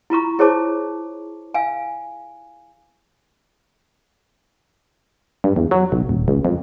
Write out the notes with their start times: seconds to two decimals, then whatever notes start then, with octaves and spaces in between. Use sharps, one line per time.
0.10 E4 F4 A#5 C#6
0.39 E4 G#4 C5 C#5 A5 D6
1.54 F5 G#5
5.44 G2
5.56 E2
5.71 F#3
5.92 B1
6.09 D#1
6.28 C#2
6.45 F2